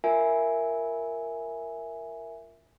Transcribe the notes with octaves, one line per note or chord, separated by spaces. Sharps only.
F4 A#4 E5 G#5